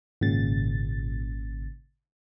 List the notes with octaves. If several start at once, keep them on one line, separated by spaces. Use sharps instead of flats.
G#1 A#2 C#3 A6